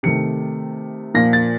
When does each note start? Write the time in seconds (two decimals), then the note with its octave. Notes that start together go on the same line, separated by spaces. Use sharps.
0.03 C3 D#3 A3 C#7
1.14 A#2 F3 A#3 A#6
1.33 A6